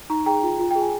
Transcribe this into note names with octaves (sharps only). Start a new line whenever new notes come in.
D#4 A#5 C#6
G#4 G5 A#5
F4
F4
G#4 G5
G#5